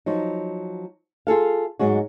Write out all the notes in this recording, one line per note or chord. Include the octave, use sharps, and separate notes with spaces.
F3 F#3 D#4
F4 G#4 A4 F5
G#2 F#3 G#3 F#4